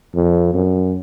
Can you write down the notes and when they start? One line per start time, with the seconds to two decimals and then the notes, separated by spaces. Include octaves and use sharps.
0.15 F2
0.54 F#2